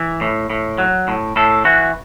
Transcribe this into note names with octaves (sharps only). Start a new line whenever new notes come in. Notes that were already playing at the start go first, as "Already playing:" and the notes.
Already playing: E3
A2
A2
F#3
A2
A2 A4
E3 F#4